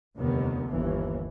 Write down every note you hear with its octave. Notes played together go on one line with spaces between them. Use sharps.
F1 D#2 D3 D#3 G3 B3
G1 D#2 E3